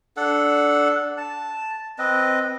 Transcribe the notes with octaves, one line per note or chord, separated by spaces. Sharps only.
D4 A4 F#5
A5
C4 B4 D#5